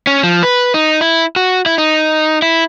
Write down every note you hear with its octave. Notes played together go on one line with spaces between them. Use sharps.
C#4
F3
B4
D#4
E4
F#4
E4
D#4
E4